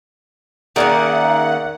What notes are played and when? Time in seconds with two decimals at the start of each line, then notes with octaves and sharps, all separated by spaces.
0.76 D#3 A#3 C#4 G#4 A#4 D5 E5 F#5